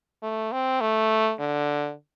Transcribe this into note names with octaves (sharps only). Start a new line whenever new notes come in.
A3
C4
A3
D3